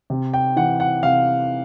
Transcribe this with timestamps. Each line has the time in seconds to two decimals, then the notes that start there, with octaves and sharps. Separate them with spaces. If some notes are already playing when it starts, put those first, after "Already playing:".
0.10 C3
0.34 G5
0.56 E3 F#5
0.80 F#5
1.03 C3 F5